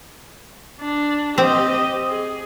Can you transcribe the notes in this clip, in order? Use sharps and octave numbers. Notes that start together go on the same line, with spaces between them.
D4
C4 G4 D#5
G#4